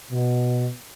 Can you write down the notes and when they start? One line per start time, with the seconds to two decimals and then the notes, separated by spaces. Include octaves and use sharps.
0.11 B2